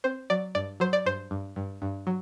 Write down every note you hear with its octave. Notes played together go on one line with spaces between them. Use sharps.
C4 C5
F#3 D5
G2 D5
F#3 C5
D5
G2 C5
G2
G2
G2
F#3